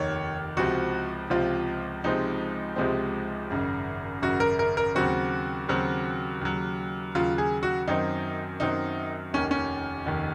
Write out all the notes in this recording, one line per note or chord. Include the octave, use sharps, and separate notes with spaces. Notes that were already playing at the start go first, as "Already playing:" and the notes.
Already playing: F1 D#2 D#3 C#5
C#2 C3 F3 C4 F#4
C#2 C3 F3 C4 F4
C#2 C3 F3 G#3 C4 D#4
C#2 C3 F3 G#3 C4
G#1 F#2 C#3
G#1 F#2 C#3 F#4
A#4
A#4
A#4
D#2 C#3 F#3 C4 F#4
D#2 C#3 F#3 C4
D#2 C#3 F#3
D#2 C#3 F#3 F4
G#4
F#4
F#2 D#3 F#3 C4 D#4
F#2 D#3 F#3 C4 D#4
F1 D#2 D#3 C#4
C#4
F1 D#2 D#3